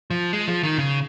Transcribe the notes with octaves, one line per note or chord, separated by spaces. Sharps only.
F3
G#3
F3
D#3
C#3